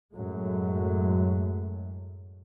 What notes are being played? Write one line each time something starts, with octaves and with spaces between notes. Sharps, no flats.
F#2 A2 F#3 G#3 A3